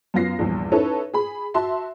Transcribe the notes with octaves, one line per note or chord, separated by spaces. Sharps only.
F#2 B3 F4 A#6 C7
A#1 E2 G2
C#4 D#4 E4 A4 B4 C#5
G#4 B5
F#4 E5 A5 C6